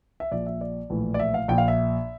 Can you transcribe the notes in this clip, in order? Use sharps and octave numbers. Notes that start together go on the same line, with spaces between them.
E5
A#1 A#2 D5
E5
D5
A#1 A2 E3
D5
E5
F5
A#1 A#2 G5
F5
E5